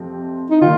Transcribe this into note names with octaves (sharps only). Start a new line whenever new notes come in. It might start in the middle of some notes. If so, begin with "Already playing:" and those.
Already playing: F2 C3 F3 C4
D#4
D#3 G3 A#3 F4